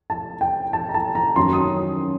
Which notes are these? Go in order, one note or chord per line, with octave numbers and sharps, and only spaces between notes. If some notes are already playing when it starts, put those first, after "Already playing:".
A5
G5
A5
A#5
A5
A#5
F#2 D#3 F#3 C6
D#6